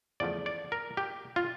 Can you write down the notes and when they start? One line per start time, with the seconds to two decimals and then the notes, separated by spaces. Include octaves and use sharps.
0.20 E2 C#3 F3 A3 D5
0.46 D5
0.72 A#4
0.97 G4
1.36 F4